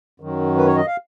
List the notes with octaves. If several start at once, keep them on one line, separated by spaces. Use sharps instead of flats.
F#2 D#3 F#3
B4
C#5
D#5
F5